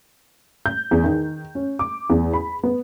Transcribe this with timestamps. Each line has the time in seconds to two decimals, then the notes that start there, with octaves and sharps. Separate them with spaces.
0.66 G6
0.91 E2
1.04 D#3
1.55 C#4
1.79 D6
2.10 E2
2.33 B5
2.63 B3